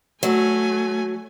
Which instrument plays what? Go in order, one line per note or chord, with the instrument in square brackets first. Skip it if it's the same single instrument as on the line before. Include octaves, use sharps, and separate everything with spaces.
[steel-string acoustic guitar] F#3 [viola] A3 G#5